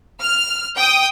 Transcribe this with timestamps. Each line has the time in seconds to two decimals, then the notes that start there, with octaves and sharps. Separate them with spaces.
0.21 F6
0.76 G5 D#6